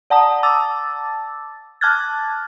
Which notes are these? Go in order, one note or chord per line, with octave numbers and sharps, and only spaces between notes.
D5 F#5 A5 A#5 D#6
A5 D6 E6 A6
A5 D6 F6 F#6 G#6 A6